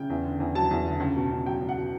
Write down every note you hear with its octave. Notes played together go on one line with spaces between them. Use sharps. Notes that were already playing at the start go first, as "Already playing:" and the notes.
Already playing: C#3 G5
E2
D3
E2
F#3 A5
E2
D3
C#2
B2
C#2
F#3 G5
C#2
F#5
B2